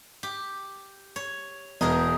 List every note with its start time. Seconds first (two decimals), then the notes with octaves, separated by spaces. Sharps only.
0.23 G4
1.16 C#5
1.81 E1 B3 D#4 G#4 A#4